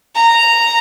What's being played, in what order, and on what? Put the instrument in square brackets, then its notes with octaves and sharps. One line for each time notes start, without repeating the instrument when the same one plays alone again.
[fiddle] A#5